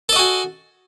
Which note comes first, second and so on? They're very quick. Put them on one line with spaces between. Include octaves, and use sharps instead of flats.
A4 D#5 F#4 G#5